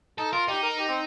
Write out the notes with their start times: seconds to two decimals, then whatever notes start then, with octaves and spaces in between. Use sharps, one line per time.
0.18 D#4 A4
0.32 F4 A#4
0.48 D#4 G4
0.63 A#4
0.79 G4
0.88 C4